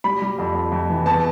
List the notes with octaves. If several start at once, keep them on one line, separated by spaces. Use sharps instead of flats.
G3 B5
G3
F2
F2
F2
E3
E2 A5